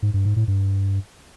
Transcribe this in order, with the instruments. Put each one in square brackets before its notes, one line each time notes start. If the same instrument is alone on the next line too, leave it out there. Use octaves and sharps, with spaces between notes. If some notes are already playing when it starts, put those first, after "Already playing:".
[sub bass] G#2
G2
G#2
A2
G2